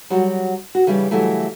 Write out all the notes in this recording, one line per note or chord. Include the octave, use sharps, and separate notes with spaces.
F#3 G3 F#4
F#4
C#3 E3 G3 B3 D4 G4
C#3 E3 F#3 G3 A3